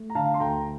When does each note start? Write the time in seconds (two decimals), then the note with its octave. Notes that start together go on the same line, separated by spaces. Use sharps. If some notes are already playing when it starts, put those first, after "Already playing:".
Already playing: A3
0.10 A#5
0.15 D3 F5 A5
0.34 C6
0.39 D2 G5 A#5